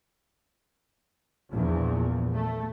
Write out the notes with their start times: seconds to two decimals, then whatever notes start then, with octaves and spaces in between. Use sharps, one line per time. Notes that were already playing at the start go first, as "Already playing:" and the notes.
1.53 A#1 E2
2.34 A3